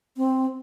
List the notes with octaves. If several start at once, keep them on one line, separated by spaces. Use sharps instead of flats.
C4